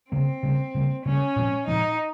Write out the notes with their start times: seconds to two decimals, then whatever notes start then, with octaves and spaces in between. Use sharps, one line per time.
0.11 C#3 G3 A#3 C4
0.43 C#3 G3 A#3
0.74 C#3 G3 A#3
1.05 C#3 G3 A#3 C#4
1.36 A#2 F3 G#3 C4
1.67 A#2 F3 G#3 C4 D#4